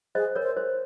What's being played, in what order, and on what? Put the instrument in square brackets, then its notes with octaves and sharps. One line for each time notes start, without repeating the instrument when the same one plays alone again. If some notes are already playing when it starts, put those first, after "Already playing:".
[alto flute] G#4 [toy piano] C5 D#5
[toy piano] A#4 C#5
[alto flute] C5
[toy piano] C5